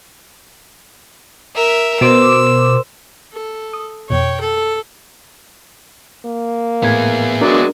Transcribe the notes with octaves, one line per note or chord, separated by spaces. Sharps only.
A#4 E5
B2 A#4 C5 C6 D6 E6
A4
D#6
F2 B2 C#5 G5
A4
A#3
A2 B3 G#4 G#6
F#3 G#3 D4 A#4 D5